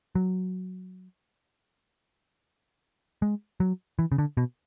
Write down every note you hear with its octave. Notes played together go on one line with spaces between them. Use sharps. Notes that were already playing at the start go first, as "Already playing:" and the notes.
F#3
G#3
F#3
E3
C#3
D3
B2